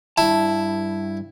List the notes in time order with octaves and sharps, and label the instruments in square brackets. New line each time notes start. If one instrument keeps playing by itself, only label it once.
[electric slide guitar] G2 A5 [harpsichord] E4